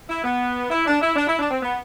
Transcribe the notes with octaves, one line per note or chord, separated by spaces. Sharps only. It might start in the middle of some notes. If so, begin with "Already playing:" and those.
E4
B3
E4
D4
E4
D4
E4
D4
C4
B3